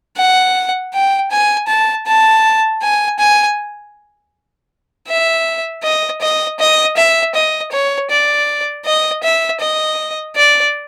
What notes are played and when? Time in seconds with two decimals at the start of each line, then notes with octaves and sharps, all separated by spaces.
0.17 F#5
0.93 G5
1.31 G#5
1.68 A5
2.06 A5
2.82 G#5
3.19 G#5
5.08 E5
5.83 D#5
6.21 D#5
6.59 D#5
6.97 E5
7.34 D#5
7.72 C#5
8.10 D5
8.85 D#5
9.23 E5
9.61 D#5
10.36 D5